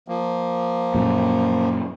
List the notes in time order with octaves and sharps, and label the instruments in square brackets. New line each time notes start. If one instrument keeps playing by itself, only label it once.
[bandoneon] F3 A#3
[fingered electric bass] F#2 A#2